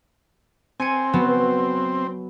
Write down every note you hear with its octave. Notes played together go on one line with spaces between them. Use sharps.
C4 G#5 C#7 D#7
F#3 B3 F#4